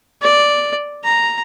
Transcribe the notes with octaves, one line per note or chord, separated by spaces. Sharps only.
D5
A#5